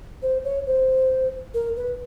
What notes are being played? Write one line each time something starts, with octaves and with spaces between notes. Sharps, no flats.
C5
C#5
C5
A#4
B4